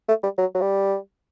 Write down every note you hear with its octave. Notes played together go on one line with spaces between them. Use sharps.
A3
G3
F#3
F#3
G3